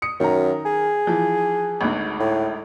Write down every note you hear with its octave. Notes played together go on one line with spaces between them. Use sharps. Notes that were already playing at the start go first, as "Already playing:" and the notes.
D#6 C#7
F#2 D#3 A#5
G#4
E3 F3
G#1 D2 G#2
A2